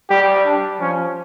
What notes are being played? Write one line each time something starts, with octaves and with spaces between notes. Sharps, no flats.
G3 G4
D4
F3 C#4